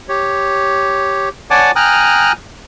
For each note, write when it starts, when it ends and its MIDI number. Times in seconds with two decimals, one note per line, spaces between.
0.09 1.29 67
0.09 1.29 73
1.51 1.71 73
1.51 1.71 74
1.51 1.71 78
1.51 1.71 80
1.51 1.71 81
1.51 1.71 86
1.76 2.32 79
1.76 2.32 80
1.76 2.32 82
1.76 2.32 87
1.76 2.32 89
1.76 2.32 90